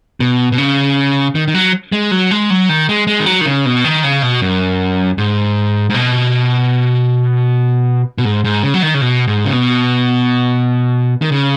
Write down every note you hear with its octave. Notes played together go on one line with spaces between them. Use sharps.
B2
B2
C#3
D#3
D#3
F#3
G#3
F#3
G#3
F#3
D#3
G#3
G#3
D#3
F#3
D#3
C#3
B2
D#3
C#3
B2
F#2
G#2
G#2
B2
B2
G#2
G#2
C#3
F#3
D#3
C#3
B2
G#2
C#3
B2
D#3
C#3